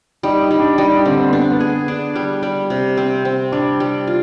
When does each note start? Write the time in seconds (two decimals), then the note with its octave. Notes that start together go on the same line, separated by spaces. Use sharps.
0.23 G3 D#4
0.42 D#4
0.51 G3
0.60 D4
0.78 G3 D#4
0.92 D4
1.05 D3 C4
1.19 C4
1.30 B3 D4
1.52 B3
1.60 G#4
1.88 D4
2.16 G3
2.43 G3
2.70 C3
2.97 C4
3.25 C4
3.52 G3 D4
3.80 G3
4.07 F4